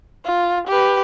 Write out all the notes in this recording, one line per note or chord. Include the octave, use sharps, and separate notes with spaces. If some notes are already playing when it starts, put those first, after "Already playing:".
F4
G4 B4